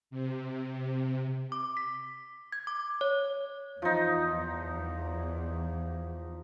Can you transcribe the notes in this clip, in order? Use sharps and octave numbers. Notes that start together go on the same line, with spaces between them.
C3
D6
B6
G#6
D6
C#5
E2 F3 D#4